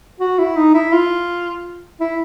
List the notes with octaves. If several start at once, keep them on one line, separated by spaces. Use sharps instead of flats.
F#4
E4
D#4
E4
F4
E4